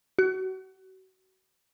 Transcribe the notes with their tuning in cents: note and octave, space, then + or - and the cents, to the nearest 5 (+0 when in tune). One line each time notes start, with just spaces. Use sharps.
F#4 +30